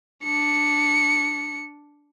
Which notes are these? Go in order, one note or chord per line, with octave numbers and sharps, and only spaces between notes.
D4 C#7